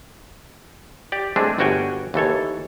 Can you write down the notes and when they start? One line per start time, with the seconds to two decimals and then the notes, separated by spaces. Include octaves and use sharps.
1.12 G4 D5
1.36 G#3 A3 C4 D4 G#4
1.58 G1 G3 F#4 C#5 G5 G#5
2.14 D#2 E3 A4 C#5